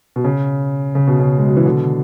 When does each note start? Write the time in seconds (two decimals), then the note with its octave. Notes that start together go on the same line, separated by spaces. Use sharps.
0.16 B2
0.24 C#3
0.95 C#3
1.07 B2
1.20 C#3
1.38 G#3
1.48 F#3
1.57 E3
1.65 B2 D3